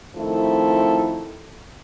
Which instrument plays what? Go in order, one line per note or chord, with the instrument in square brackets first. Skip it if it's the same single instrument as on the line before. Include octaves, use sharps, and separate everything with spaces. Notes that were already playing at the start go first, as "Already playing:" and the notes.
[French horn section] D#3 F3 A3 C4 E4 A4